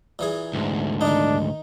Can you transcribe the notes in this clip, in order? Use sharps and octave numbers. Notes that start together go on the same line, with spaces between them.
A#2 E3 G#4
D2 G#2
D#3 D4 D#4